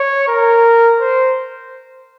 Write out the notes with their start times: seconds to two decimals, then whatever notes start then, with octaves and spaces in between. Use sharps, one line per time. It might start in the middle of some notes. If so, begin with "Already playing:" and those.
Already playing: C#5
0.28 A#4
1.00 C5